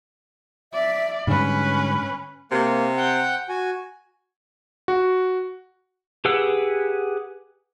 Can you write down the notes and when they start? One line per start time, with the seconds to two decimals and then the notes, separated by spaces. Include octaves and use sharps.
0.73 D5 E5
1.27 G#2 D3 G3 C#4 B4 B5
2.52 C3 A#3
2.97 F#5 G5 G6
3.49 F#4 G#5
4.88 F#4
6.25 G4 G#4 B4 F#5 E6